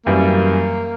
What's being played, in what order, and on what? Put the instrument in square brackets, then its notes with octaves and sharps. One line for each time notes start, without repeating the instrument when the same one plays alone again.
[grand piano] F#2 E3 G3 [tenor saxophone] A#3